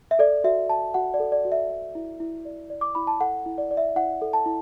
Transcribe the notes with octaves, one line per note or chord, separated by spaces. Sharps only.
E5
A4 D5
F#4 E5
D5 A5
F#4 F#5
D5
A4
D5
F#4
E5
D5
E4
E4
D5
D5
D6
E4 B5
A5
A4 F#5
E4
D5
D5
E5
E4 F#5
A4
A5
E4